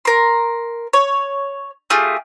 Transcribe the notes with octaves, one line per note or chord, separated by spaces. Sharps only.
A#4 C6
C#5
A3 F4 G4 G#4